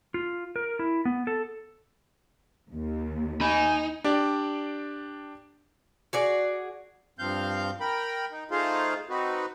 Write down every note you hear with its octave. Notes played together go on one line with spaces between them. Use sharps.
F4
A#4
E4
B3
A4
D#2
D#4 G#5 B5
D4 G4 D5
F#4 G#4 D5
G2 F3 C4 F5 G6
A#4 G5 B5
D#4
A3 D#4 F4 G#4 C5 F5
C4 D#4 F#4 B4